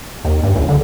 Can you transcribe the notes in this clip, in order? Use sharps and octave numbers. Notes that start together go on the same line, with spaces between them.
D#2
G2
C#2
D3